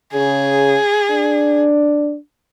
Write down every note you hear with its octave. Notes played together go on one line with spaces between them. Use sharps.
C#3 G#4
D4